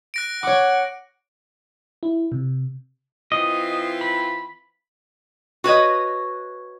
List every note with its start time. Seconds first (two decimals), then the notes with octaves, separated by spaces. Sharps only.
0.14 F#6 A#6 D7
0.43 C#5 F#5 D6
2.03 E4
2.32 C3
3.32 E3 C4 F4 D#5
4.01 B5
5.64 F#4 B4 C#5 D#5